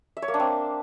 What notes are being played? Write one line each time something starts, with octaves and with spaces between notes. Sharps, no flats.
E5
C#5
A#3
D4
C4